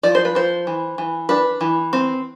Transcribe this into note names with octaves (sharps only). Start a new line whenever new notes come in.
F3 D5
C5
B4
F3 C5
E3
E3
D4 B4
E3
C4